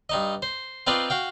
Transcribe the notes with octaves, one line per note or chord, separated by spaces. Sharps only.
G2 D#4 D#5
C5
C4 D#4 F4 B4 C5 D5
F#4 F5 G5